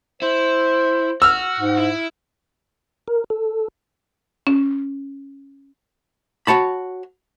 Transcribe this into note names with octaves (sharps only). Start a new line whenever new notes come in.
E4 C5
F#4 E6 F6
G#2
E4
A#4
A4
C#4
F#4 C#5 A5 B5